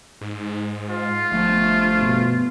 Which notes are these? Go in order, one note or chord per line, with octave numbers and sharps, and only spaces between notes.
G#2
F4
G1 F3 A3
B2